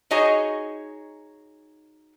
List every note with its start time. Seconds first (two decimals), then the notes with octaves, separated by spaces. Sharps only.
0.11 D#4 F#4 G#4 C#5 D#5 G#5